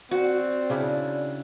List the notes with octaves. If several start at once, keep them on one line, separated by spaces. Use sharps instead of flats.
C4 F#4 D5
C#3 D4 E4